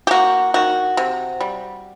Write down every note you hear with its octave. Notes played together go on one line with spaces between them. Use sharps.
G4
A#3 F#4
D#3 F#4
C3
G3